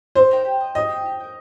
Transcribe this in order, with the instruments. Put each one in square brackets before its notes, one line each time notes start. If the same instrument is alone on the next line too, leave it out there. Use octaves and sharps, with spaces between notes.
[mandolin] C4 [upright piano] C5
[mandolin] D#4 A#4 G5
G4
D#5 G5
[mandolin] G4 [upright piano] D#5
[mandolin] C5 G5
G4
A#4 G5